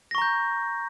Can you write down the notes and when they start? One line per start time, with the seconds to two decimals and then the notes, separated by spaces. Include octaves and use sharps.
0.11 A#6
0.15 C#6
0.18 A#5
0.22 G6